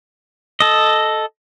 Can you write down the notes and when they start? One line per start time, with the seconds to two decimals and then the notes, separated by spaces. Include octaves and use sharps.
0.60 A4 D#5